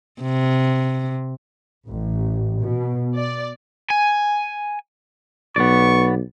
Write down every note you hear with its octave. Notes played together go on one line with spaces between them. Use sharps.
C3
A1
B2
D5
G#5
B1 B3 D5 C#6